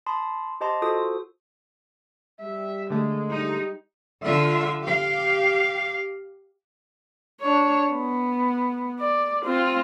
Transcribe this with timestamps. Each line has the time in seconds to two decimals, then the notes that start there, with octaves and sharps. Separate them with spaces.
0.06 A5 B5 C6 D#6
0.61 G4 C5 D#5 A5 C6
0.82 F4 F#4 A4 C5 D#6
2.41 G3 E5
2.90 D3 G#3 A3
3.30 G3 D#4
4.24 D3 F4 E5
4.84 G4 F5
7.41 D4 C#5
7.92 B3
9.00 D5
9.45 C4 F4